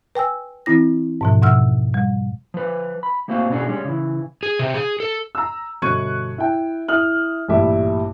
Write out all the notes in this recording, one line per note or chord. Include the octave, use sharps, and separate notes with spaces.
B4 G5 G#5 E6
E3 C4 E4 A#6
G#2 B2 F3
F2 B2 F3 F#5 E6 F6
G3
F3 B4
B5
A3 A#3 C4 F#4 F5
B2 C#4 D4 F#4 G#4
G3 G#3 C#4
C#3 E3
G#4
C3
G#4
A4
A#5 E6
G1 B2 C#6 F#6 G#6 D#7
E4 G5
E4 D#6 F6 F#7
A1 G2 A#2 G3 E5 D6